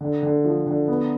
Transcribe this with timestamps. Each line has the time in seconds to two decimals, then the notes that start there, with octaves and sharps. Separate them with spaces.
0.01 D3
0.23 D3
0.44 F3
0.67 D3
0.88 B3